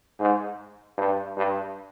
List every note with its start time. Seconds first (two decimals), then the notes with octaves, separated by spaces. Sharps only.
0.19 G#2
0.98 G2
1.37 G2